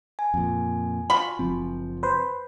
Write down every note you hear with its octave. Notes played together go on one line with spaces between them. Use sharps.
G#5
F2 A#2
F4 F#4 B5
F#1 F3 C4
B4 C5